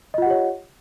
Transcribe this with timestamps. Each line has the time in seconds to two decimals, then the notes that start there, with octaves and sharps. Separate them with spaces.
0.14 D#5
0.18 F4
0.22 F#5
0.26 G4
0.30 C#5